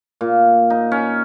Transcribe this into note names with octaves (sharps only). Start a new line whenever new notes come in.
A#2
D#4
C#4